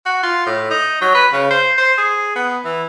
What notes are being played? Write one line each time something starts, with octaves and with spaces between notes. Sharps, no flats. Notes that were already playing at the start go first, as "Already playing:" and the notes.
F#4
F4
A2
D#4
F#3
B4
C#3
C5
C5
G#4
B3
E3